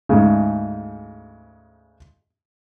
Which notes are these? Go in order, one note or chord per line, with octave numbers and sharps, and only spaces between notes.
D2 G#2 C#3